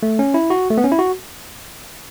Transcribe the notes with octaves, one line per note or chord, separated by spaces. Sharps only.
A3
C#4
E4
F#4
A3
B3
C#4
E4
F#4